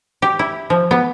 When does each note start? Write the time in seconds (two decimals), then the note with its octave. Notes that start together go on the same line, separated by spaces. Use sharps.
0.22 G4
0.39 E4
0.70 F3
0.91 B3